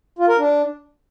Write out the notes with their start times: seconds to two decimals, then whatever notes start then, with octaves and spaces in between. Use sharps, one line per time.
0.19 F4
0.28 A#4
0.38 D4